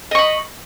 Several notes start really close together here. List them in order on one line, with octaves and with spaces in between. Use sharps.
D#5 C#6 B5